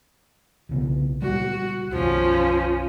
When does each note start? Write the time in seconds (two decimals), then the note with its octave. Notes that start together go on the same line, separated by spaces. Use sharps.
0.69 B1 C#3 B3
1.22 C#2 A#2 G3 F#4
1.92 B1 F#2 F3 C#4